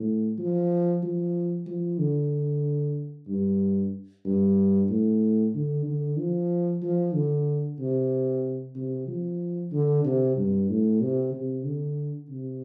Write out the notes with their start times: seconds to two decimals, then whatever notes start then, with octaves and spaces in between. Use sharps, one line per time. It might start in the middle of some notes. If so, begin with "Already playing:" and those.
Already playing: A2
0.38 F3
1.03 F3
1.67 F3
1.99 D3
3.28 G2
4.25 G2
4.89 A2
5.54 D3
5.86 D3
6.18 F3
6.83 F3
7.14 D3
7.79 C3
8.76 C3
9.08 F3
9.72 D3
10.05 C3
10.36 G2
10.69 A2
11.01 C3
11.33 C3
11.66 D3
12.29 C3